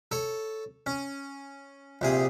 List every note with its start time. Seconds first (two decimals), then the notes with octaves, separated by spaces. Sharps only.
0.11 A4 C#5
0.86 C#4
2.01 A#1 C3 G#4